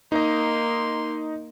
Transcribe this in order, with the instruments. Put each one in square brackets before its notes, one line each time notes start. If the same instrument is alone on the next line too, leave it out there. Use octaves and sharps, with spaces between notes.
[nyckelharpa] A#3 C6 [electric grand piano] D#4 D#5